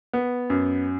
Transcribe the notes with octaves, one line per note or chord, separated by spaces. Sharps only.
B3
F#2